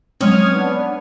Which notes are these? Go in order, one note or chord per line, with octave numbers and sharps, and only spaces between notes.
F#3 G#3 C4 C#4 C#5 D#6 F6 G#6
B3 D4